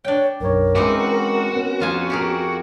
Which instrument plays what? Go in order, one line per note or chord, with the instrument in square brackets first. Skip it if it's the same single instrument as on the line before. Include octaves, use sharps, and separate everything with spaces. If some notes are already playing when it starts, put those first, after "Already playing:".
[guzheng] D4 G5 [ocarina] C#5
[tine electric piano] B1 F#2 C#5 [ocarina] A#4
[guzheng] E3 C4 D#4 [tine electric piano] G#3 C#4 D6 [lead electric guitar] F#4
[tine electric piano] B3 C#4
[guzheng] F2 F4 G#5
G4 G#4 A#4